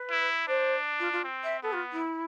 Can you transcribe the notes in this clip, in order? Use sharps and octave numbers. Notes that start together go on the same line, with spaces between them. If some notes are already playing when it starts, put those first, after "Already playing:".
Already playing: B4
E4
D4 C5
F4
F4
C4
E5
B3 A4
F4
E4